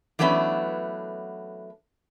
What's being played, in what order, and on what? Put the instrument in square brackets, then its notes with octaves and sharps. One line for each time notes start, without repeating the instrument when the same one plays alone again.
[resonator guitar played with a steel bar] E3 F#3 A3 B3 C#4 D4